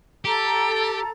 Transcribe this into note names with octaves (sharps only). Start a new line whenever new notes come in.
G4 A4 A#5